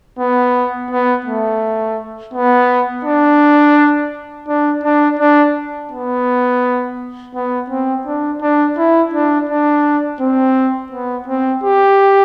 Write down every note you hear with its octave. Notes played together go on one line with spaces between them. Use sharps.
B3
B3
A3
B3
D4
D4
D4
D4
B3
B3
C4
D4
D4
E4
D4
D4
C4
B3
C4
G4